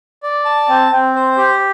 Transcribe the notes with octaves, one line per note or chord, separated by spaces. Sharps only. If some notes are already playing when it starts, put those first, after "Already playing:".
D5
A5
C4
C4
C5
G4